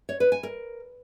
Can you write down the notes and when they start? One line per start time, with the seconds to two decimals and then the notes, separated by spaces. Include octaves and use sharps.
0.09 C#5
0.20 B4
0.32 G#5
0.43 A#4